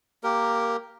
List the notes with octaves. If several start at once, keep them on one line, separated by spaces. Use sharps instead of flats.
A#3 G4 A#4